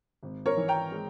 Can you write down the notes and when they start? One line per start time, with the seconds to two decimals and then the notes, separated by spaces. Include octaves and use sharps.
0.23 G#1
0.46 A#4 C#5
0.57 E3
0.68 G5 A#5
0.92 G#3